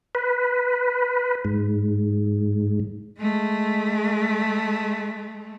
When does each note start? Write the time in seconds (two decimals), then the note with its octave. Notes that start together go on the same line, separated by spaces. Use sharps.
0.15 B4
1.45 G#2
3.18 G#3 A3